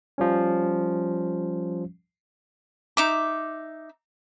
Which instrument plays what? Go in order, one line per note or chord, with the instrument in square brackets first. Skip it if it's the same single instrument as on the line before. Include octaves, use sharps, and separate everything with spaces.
[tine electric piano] F3 G3 C#4
[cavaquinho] D#4 E5 D6